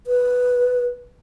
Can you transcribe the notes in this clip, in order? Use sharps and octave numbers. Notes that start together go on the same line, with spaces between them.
B4